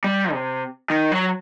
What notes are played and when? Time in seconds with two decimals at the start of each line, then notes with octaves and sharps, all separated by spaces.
0.04 G3
0.32 C3
0.90 D#3
1.12 F#3